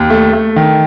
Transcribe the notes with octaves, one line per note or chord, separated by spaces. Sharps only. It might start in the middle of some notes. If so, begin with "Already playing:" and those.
Already playing: D#2
A3
A3
D#3